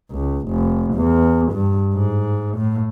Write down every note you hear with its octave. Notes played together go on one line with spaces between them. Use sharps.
C#2
F1
E2
G2
G#2
A2